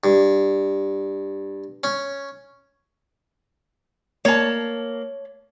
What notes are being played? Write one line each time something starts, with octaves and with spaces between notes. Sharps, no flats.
G2
C#4
A#3 C#5 A5